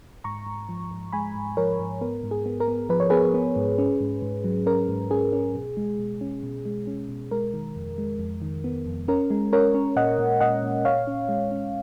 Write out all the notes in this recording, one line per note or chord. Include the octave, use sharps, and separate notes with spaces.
G#2 A#5 C#6
G#2
F3
G#2
G#3 G#5 B5
G#2
F3 A#4 C#5
G#2
B3 A#4
G#2
G#4
B3
A#4
B3
F3 B4
C#5
B3 G#4 B4
B3
G#2
C#4
G#2
G#2
F#3
C#4 A#4
G#2
C#4 G#4
C#4
B2
G#3
B2
C#4
B2
G#3
C#4
B2
G#3 A#4
D#3
F2
G#3
F2
D#3
B3
F2
C#4 A#4
G#3
C#4 A#4 C#5
C#4
A#2 D#5 F#5
A#2
A#2 D#5 F#5
A#2
A#2 C#5 F5
C#4
G#3
C#4